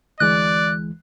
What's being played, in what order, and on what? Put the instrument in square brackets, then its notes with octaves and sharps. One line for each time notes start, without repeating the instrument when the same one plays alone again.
[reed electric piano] D2 E3 G#3 [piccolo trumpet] D5 [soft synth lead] F#6